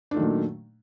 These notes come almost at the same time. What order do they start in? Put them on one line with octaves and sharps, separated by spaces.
D4 A3 D#3 F#3 A#2